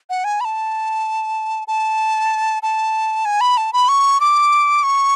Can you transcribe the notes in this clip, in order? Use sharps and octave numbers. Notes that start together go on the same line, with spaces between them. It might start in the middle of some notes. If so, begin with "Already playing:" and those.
F#5
G#5
B5
A5
A5
A5
G#5
B5
A5
B5
C#6
D6
C#6